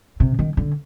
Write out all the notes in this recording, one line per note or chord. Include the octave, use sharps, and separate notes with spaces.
C3
D#3
D3